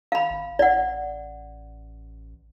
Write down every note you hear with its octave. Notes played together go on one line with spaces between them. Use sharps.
F5 B5
G#1
A1 D5 F#5